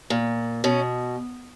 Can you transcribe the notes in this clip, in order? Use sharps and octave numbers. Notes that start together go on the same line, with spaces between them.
A#2
B2 C#4